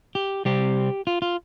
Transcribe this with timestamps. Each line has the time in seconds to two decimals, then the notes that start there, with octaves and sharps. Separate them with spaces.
0.15 G4
0.45 C3 G3 C4 G4
1.07 F4
1.22 F4